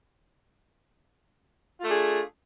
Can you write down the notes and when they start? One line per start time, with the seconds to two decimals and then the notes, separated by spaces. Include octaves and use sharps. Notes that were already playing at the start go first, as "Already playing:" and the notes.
1.80 F4
1.84 A3
1.87 D4
1.91 G#4